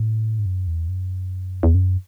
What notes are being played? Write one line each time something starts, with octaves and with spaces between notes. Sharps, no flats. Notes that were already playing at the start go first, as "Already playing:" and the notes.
Already playing: A2
G#2
F#2
E2
F#2
E2
F#2